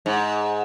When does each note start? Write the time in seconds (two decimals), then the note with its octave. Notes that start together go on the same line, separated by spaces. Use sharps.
0.06 G#2